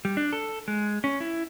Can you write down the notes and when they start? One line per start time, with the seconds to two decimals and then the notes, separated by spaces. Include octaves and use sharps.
0.05 G3
0.17 D4
0.33 A4
0.68 G#3
1.04 C#4
1.20 E4